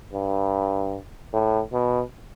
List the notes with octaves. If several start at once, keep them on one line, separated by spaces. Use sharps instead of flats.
G2
A2
B2